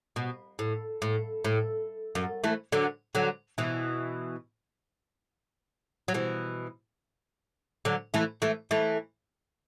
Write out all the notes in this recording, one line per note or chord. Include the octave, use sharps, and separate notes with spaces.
B2
A2
A2
A2
F#2
E3 A3
D3 F#3
D3 F#3
B2 E3
F#3
B2 E3
D3 F#3
E3 A3
E3 A3
E3 A3